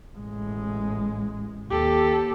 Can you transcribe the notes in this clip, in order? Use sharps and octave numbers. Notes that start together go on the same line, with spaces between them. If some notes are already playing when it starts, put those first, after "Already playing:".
A1 G#3
D#2 G4 A4